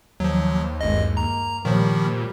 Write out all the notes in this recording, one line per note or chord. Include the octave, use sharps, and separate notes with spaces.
D#2 F3 F#3
G#1 G2 G#3 D#5
A#3 A#5
A#2 D#3 F3 G3 A#3